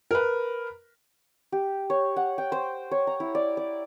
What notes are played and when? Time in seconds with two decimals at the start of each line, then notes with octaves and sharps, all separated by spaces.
0.11 A#4 B4
1.52 G4
1.90 C#5
2.16 F#5
2.38 G5
2.52 C5
2.91 C#5
3.07 A#5
3.20 E4
3.35 D5
3.57 D5